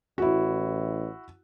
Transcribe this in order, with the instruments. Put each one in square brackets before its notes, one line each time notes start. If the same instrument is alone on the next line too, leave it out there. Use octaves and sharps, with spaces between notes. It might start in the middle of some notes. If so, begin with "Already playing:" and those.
[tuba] A1 [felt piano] E4 F#4